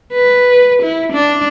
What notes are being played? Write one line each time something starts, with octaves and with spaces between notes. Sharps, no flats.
B4
E4
D4